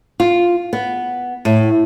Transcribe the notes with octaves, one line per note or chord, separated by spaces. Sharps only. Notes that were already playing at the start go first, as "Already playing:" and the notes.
F4
B3
A2